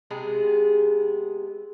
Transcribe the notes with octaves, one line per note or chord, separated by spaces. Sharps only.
C3 G#3 B3 G#4